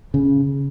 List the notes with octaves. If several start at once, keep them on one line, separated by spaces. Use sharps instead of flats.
C#3